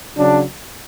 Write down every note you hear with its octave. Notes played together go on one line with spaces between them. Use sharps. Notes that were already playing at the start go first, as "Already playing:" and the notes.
C#3 F#3 D4